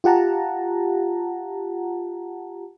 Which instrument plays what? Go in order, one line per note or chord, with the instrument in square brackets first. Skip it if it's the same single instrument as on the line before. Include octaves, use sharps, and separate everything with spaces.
[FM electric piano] F4 G4 F#5 A5 A#5